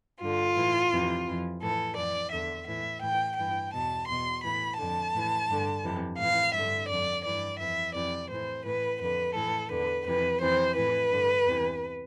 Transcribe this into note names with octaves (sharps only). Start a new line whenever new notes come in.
G2 D3 F4
A2 E3
F2 C3 E3
F2 E3
A2 E3 A4
F2 E3 D5
E2 D3 E5
A2 E3 E5
A2 E3 G5
G2 E3 G5
E2 B2 A5
E2 B2 C6
A2 E3 B5
F2 D3 A5
A2 E3
G2 D3
F2 C3 E3
A2 E3 F5
G2 D3 E5
F2 D3 D5
G2 E3 D5
F2 E3 E5
F2 C3 E3 D5
A2 E3 C5
A2 E3 B4
F2 D3 B4
A2 E3 A4
E2 D3 B4
F2 C3 E3 B4
F2 C3 E3 C5
A2 E3 B4
G2 D3
E2 C3 E3